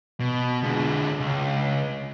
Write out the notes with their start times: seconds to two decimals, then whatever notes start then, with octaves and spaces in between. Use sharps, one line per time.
0.20 B2
0.64 D3 G#3
1.20 C#2